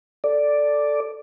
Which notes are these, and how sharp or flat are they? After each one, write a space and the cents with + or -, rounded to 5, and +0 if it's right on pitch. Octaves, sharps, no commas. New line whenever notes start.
A4 +0 D5 +0